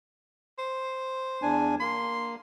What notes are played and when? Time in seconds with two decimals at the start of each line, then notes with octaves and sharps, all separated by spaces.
0.58 C5
1.42 E2 D4 G#5
1.80 A#3 C6